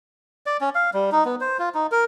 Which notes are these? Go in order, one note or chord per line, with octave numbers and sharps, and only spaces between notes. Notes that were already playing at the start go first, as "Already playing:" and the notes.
D5
C#4
F5
G3
D#4
B3
C5
F4
D#4
A#4